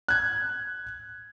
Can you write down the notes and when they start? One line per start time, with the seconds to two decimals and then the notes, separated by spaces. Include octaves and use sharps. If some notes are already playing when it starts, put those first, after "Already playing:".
0.08 F#6 G#6